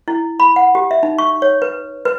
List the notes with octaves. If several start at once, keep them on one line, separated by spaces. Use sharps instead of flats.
E4
B5
F#5
G4
E5
D#4
C#6
C#5
B4
B4